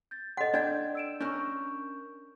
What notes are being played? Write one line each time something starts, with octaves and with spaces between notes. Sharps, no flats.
G6 A6
A4 D#5 F#5 C6
D4 D5 G5
E6 D7 E7
C#4 D4 A#4 C#6 G6